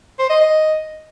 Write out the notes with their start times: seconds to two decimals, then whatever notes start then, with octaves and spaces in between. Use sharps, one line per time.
0.19 C5
0.30 D#5
0.41 D#5